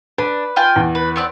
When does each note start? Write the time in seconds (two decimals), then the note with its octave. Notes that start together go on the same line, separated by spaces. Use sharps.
0.18 D4 B4
0.56 F4 G5 G#5
0.76 E2
0.95 B4
1.16 B3 C4 D5